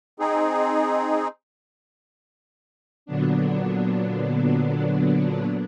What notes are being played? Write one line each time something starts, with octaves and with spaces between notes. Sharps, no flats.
C4 D#4 G#4
A#2 D3 F#3 B3 D4